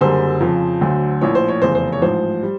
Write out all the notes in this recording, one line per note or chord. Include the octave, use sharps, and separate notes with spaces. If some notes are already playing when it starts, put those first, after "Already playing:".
F#1 F#2 D3 G3 C5
F2 C#3 F3
D2 D3 F#3
A#1 A2 F3 C#5
C5
C#5
F1 E2 C#3 C5
C5
C#5
A1 G#2 F3 C5
G3